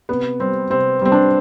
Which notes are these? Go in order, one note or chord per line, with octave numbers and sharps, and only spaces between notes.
C3 B3
G3 C4
C3 C4
G3 C4
D4